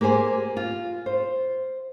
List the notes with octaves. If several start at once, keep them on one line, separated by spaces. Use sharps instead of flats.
A#3 G4 G#4 C5 G#5
F4
C5